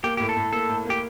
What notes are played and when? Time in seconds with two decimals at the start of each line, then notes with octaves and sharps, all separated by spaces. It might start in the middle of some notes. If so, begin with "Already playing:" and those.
0.03 A#3 G4
0.17 A2 G4
0.29 A4
0.37 A2
0.53 A#3 A4
0.69 A2
0.85 A#3 G4